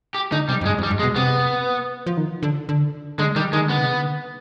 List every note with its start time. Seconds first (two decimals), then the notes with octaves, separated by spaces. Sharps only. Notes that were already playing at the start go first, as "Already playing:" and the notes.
0.14 G4
0.32 D3 D#4
0.49 C3 G3
0.61 F2
0.65 G2 G#3
0.78 F2
0.83 G3
0.91 G2
0.99 G#3
1.03 B2
1.16 C3 B3
2.06 F3
2.17 D#3
2.43 D3
2.69 D3
3.18 D3 G#3
3.36 D#3 G3
3.53 D#3 G#3
3.66 D3 B3
3.78 C3
3.92 D3